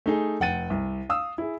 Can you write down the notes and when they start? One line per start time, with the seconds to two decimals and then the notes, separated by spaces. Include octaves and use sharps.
0.06 A3 D#4 G#4
0.40 F1 F#5 G5 A6 D#7
0.70 C2
1.09 F5 D#6 E6
1.38 E4 G#4